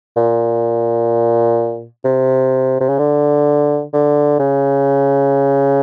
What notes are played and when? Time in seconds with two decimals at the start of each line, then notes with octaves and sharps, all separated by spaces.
0.16 A#2
2.04 C3
2.80 C3
2.89 C#3
2.99 D3
3.93 D3
4.39 C#3